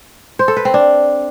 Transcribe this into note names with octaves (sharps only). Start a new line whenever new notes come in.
C5
A4
B4
C4
D4